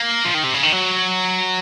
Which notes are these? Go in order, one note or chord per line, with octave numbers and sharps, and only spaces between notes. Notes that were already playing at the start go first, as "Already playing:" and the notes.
Already playing: A#3
F3
D#3
C3
C#3
D#3
F#3